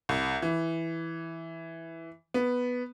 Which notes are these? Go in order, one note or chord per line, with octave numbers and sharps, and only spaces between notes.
C2
E3
B3